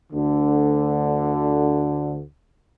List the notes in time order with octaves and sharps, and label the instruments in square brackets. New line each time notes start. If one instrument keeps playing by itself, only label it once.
[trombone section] D2 D3